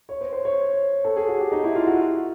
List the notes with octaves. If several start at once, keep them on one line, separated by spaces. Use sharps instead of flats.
C#5
C5
C5
C#5
A4
G#4
F#4
G4
D#4
E4
F4
F#4